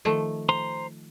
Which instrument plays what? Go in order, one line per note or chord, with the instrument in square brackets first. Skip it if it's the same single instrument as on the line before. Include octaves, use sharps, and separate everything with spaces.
[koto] D#3 F3 A3
[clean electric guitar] C5 A#5 C6